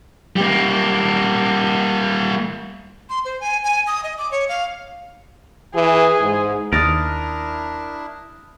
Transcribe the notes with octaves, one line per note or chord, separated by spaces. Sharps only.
G3 A#3
C6
C5
G#5
G#5
D#6
D#5
D6
C#5
F5
E3 G#4
G#2
D#2 D4 E4 A#4 D#6 F6 A6